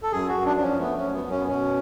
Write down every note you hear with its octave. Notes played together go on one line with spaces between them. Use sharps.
A4
F#2 G#4
F#4
F#2
D4
F3 D4
C#4
A3 B3
C#4
F#2
B3
F#2
C#4
B3
B2 C#4